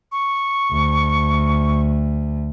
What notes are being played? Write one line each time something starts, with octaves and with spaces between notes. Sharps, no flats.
C#6
D2